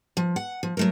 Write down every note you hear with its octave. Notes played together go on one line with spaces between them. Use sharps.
F3
F#5
F3
F#3 A3 A#4